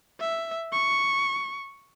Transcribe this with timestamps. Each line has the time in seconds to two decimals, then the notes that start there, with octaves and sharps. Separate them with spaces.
0.20 E5
0.72 C#6